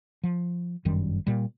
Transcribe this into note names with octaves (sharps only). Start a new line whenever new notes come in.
F3
G1 F#2 D#3 G3
A#2 G3